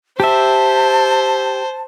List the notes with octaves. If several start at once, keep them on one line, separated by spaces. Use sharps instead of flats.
G4 C5 E5 A5